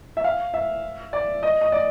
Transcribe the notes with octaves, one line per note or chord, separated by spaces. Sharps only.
E5
F5
E5
D5
D#5
D#5
D5